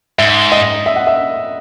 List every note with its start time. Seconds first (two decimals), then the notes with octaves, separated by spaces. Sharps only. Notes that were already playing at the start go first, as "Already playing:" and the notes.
0.18 G#2 E5
0.52 D#5
0.86 E5
0.96 F#5
1.07 E5